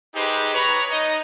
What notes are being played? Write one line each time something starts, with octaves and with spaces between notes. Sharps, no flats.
D#4 G4 G#4 B4 C5
B4 C#5 A#5
D#4 D#5